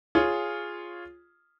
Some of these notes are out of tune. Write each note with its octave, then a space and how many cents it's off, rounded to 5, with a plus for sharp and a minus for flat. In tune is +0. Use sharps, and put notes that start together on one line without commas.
F4 +0 G#4 +0 C#5 +0